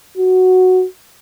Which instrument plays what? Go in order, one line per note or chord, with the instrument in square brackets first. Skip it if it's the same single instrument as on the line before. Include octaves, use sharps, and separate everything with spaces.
[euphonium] F#4